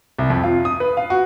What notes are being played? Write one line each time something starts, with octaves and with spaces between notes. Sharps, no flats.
C2
F2
F4
D#6
B4
F5
F#4